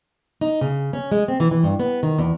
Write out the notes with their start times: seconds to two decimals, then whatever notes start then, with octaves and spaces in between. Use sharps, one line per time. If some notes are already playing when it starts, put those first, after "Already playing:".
0.41 D#4
0.61 C#3
0.93 C#4
1.11 G#3
1.28 C4
1.40 E3
1.51 E3
1.64 G2
1.79 B3
2.03 D#3
2.18 E2